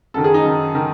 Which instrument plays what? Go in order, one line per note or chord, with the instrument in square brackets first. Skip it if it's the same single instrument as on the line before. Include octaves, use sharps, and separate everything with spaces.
[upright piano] F#2 D#3 A4
G#4
D#4
F#2 D#3
D#3